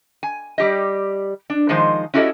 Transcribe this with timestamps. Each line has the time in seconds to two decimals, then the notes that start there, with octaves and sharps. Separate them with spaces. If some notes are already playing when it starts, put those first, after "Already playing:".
0.23 G#5
0.58 G3 G4 D#5
1.50 D4
1.69 D#3 F3 G#3 D#4 C5
2.14 C#4 E4 F#4 G4 A4 D#5